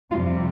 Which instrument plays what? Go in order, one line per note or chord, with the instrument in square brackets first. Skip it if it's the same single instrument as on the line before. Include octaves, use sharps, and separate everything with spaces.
[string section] F2 C3 G3 F4